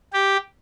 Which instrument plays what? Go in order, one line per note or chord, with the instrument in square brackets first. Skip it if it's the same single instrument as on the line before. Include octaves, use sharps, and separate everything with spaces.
[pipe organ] G4